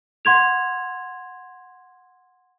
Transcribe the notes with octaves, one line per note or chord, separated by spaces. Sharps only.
F#5 C6 G#6 F7